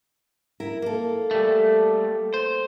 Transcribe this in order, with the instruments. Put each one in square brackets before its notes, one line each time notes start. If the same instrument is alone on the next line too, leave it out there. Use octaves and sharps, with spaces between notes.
[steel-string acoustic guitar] E4 A#4
A#3 A4
[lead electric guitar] G3 A3
C5